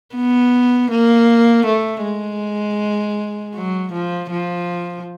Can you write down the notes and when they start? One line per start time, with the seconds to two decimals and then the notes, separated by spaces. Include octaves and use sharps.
0.15 B3
0.90 A#3
1.66 A3
2.03 G#3
3.55 F#3
3.92 F3
4.30 F3